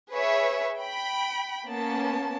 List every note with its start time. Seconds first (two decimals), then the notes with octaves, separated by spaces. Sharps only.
0.12 G#4 B4 C#5 E5
0.80 G5 B5
1.67 A#3 B3 C#4 A5